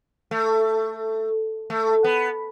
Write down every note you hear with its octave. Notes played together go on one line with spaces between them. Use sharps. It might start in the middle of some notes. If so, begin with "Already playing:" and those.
A3
A3
B3